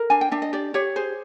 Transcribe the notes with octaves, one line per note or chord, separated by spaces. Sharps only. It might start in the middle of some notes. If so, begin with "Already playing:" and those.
Already playing: A#4
D4 G#5
G5
D4 E5
D#5
G4 D5
G4 C#5
G#4 C5